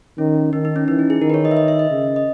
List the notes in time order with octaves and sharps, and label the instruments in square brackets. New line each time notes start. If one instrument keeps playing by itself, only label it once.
[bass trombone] D#3 [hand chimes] C#4
[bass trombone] D#3 [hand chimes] D#4
[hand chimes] D#4
C#4
[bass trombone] E3 [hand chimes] D#4
[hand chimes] E4
G#4
[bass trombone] D#3 [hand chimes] A#4
[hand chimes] B4
C#5
D#5
E5
D#5
E5
D#5
[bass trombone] C#3
[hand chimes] D#5